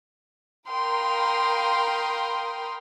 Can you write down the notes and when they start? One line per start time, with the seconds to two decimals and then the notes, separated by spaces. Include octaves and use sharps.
0.69 A#4 F5 G5 B5 C6 D#6